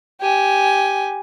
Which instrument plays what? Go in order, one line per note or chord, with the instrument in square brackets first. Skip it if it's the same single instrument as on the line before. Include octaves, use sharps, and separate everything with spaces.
[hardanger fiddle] G4 G#5